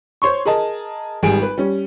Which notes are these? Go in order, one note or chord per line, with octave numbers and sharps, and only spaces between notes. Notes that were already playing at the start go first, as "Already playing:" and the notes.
C5 C#5 C6 C#6
G#4 A#4 D#5 A5
G#1 G3 G#4 G#5 D7
B4
G3 C#4